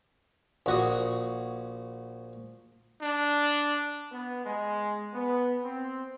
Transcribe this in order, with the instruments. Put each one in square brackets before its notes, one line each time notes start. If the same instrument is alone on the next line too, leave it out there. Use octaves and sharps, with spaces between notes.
[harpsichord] A#1 F#4 D#6
[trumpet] D4
[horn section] B3
G#3
B3
C4